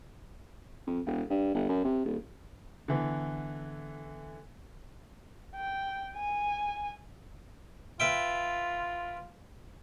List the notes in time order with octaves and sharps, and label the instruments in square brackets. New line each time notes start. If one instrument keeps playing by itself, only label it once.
[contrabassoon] F2
E1
G2
G1
F#2
C3
D#1
[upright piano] D3 E3 B3
[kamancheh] G5
G#5
[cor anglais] F4 [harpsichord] B4 E5 G5